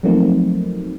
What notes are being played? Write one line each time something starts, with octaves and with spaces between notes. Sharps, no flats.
F3 F#3 A3 A#3 C4 D#4